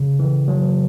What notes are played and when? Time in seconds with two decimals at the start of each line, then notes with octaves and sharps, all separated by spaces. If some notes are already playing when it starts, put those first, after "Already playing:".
Already playing: C#3
0.19 E3
0.48 F#3